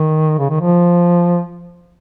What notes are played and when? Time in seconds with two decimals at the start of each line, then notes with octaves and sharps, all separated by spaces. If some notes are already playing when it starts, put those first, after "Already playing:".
Already playing: D#3
0.39 C#3
0.50 D#3
0.60 F3